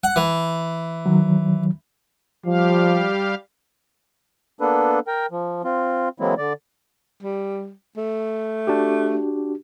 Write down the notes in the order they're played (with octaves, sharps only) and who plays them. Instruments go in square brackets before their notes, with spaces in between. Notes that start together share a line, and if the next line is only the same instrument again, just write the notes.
[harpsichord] F#5
E3
[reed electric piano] D#3 F#3
[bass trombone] F3 [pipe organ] G3 G4 F5
[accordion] A#3 B3 D4 A4 B4
A#4 G5
F3
C4 F4
E3 F#3 G#3 A#3 C4 E4
D3 D5
[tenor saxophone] G3
A3
[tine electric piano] D4 F#4 G4